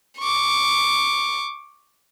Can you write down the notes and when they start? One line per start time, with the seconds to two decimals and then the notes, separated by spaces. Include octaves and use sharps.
0.19 C#6 D6